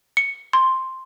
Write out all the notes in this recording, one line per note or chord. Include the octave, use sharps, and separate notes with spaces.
C#7
C6